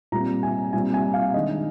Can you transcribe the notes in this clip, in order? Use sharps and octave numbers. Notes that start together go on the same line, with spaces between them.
A#2 G3 C4 A#5
G#5
A#2 G3 C4 G#5
G#5
F5
D#3 G#3 D4 D#5